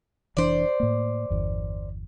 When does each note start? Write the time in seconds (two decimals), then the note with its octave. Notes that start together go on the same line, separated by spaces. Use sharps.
0.37 F1 E3 D4 C5 D5
0.80 A2 A#3
1.30 G1 E2